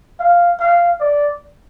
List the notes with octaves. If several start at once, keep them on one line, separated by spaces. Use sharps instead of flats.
F5
F5
D5